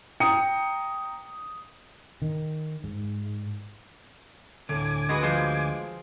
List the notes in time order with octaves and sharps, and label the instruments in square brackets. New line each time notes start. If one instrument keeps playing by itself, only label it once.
[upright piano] G5 A#5 D#6 C#7
[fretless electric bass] D#3
G#2
[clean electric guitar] D2 [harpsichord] A2 [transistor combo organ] G#5 D6
[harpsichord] G#3 [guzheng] F#4 G#4 B4
[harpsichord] F3 G#3 [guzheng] F4 C5